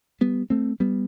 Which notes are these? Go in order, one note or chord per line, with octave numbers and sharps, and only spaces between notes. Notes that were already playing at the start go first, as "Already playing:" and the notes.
G3 B3
A3 C4
G3 B3